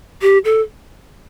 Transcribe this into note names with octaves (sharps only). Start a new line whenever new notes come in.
G4
A4